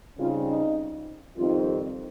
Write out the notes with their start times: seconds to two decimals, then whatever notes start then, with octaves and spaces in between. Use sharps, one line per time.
0.19 C#3 G3 C4 D#4 F4
0.48 D#4
1.37 F2 D#3 G3 C4 D#4 F4